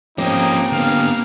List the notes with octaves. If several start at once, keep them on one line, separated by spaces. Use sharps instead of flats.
F3 A#3 C4 C#4 D#4 G4
D3 B3 F5